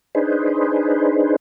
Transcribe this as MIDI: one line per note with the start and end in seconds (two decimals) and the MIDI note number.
0.15 1.36 62
0.15 1.36 63
0.15 1.36 68
0.15 1.36 71
0.15 1.36 72